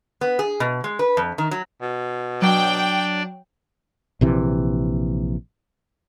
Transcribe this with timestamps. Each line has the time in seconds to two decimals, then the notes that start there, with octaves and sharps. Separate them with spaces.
0.21 B3
0.39 G#4
0.60 B2
0.84 G#3
0.99 B4
1.17 F2
1.38 D#3
1.51 F#3
1.81 B2
2.42 F#3 D4 D5 G5
4.21 A#1 C3 E3